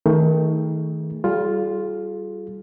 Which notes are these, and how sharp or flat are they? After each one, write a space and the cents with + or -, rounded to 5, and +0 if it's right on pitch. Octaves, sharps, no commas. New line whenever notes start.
D#3 +30 A3 +15 G#4 +0
G3 -20 F4 +5 G#4 +40